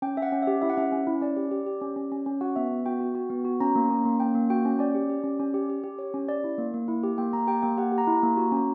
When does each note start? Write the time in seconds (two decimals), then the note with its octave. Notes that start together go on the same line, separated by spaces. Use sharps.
0.02 C#4 G5
0.17 C#4 E5
0.22 F#5
0.32 C#4
0.42 G4 E5
0.62 E4 E5
0.70 F#5
0.77 C#4 E5
0.92 C#4
1.07 E4
1.21 C#4 D5
1.36 G4
1.51 G4
1.66 G4
1.81 C#4
1.96 C#4
2.12 C#4
2.26 C#4
2.41 F#4 F#5
2.56 B3 E5
2.71 B3
2.86 F#4 G5
3.00 F#4
3.15 F#4
3.30 B3
3.45 F#4
3.60 C#4 A#5
3.75 A#3
3.90 C#4
4.05 A#3
4.20 C#4 G5
4.35 A#3
4.50 F#4 G5
4.65 C#4
4.79 C#4 D5
4.95 G4
5.10 G4
5.24 C#4
5.40 C#4
5.54 G4
5.70 G4
5.84 G4
5.99 G4 C#5
6.14 C#4
6.28 C#4 D5
6.44 E4
6.58 A#3
6.74 A#3
6.88 E4
7.03 G4
7.18 A#3 G5
7.33 A#3 A#5
7.47 G4 G5
7.63 A#3 G5
7.78 G4 F#5
7.92 G4
7.98 A#5
8.07 E4
8.18 A#3 A#5
8.37 F#4
8.52 C#4